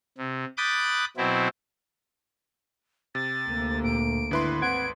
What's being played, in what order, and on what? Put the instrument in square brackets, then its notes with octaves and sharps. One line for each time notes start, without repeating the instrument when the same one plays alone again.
[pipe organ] C3
B5 D6 D#6 F#6 G6 A6
B2 F#3 C4 E4
[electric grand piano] C3 [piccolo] A6
[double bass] D2 A#3
[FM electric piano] A#2 [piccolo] D7
[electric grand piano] G#1 B4 C6 [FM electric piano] D3 E4
[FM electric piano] C4 F#5 G#6 [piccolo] D7